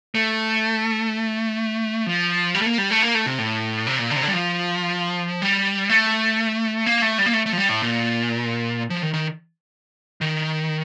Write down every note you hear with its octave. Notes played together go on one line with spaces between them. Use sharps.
A3
F3
G3
A3
A#3
G3
A3
A#3
A3
C3
A2
C3
A#2
D3
C3
D3
G3
F3
G3
A3
A#3
A3
G3
A#3
A3
A3
F3
G3
A2
A#2
F3
D#3
D#3
D#3